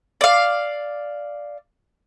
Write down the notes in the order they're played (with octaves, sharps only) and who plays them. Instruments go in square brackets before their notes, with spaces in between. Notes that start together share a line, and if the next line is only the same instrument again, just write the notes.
[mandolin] D5 F5